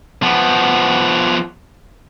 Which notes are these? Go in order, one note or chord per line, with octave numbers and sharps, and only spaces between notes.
F3 B3